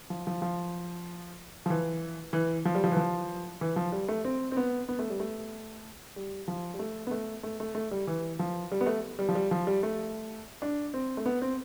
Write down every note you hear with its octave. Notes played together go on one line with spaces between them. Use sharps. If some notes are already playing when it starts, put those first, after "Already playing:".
F3
F3
F3
F3
E3
E3
F3
G3
F3
E3
F3
E3
F3
G3
A3
C4
C4
B3
B3
A3
G3
A3
G3
F3
G3
A3
B3
A3
A3
A3
A3
G3
E3
F3
G3
B3
A3
G3
F3
G3
F3
G3
A3
D4
C4
A3
B3
C4